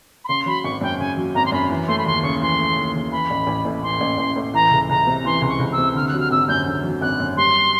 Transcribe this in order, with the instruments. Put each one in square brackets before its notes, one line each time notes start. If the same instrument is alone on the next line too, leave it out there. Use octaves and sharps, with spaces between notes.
[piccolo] B5
[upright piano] C#3 [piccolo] C6
[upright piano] F#3 [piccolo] B5
[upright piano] G#1 [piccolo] C#6
[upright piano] F#2 [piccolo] G5
[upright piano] C#3 [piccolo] G#5
[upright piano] F#3
[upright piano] G#1 [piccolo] A#5
[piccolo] C6
[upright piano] F#2 [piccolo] B5
[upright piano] E3
[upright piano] A3 [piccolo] C6
[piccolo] B5
[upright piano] D#2 [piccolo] C6
[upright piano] C#3 [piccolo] C#6
[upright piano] E3 [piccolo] C6
[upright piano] A3
D#2
C#3
[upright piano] E3 [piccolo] B5
[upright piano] A1
A1
A2
[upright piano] E3 [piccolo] C6
[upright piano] A1
A1
A2
[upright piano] E3 [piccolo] A#5
[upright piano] C#2
[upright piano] C#2 [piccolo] A#5
[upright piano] C3
[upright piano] E3 [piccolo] C6
[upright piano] C#2
[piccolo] C#6
[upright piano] C#2
[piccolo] E6
[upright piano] C3
[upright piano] D3 [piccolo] F6
[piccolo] F#6
[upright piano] F#3
[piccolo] F6
[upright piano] G#1 [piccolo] E6
[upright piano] F#2 [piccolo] G6
[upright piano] D3
F#3
[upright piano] G#1 [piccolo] F#6
[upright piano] F#2
[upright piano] G3 [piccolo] C6